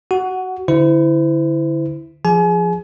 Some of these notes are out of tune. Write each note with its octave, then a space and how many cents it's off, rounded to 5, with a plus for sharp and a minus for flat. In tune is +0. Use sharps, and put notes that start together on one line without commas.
F#4 +20 F#5 +0
D3 +0 E4 +0 C5 -40
F3 -5 G#4 +0 G#5 +35